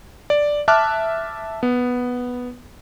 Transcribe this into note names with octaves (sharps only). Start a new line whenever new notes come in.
D5
E5 A5 D6 F6 F#6
B3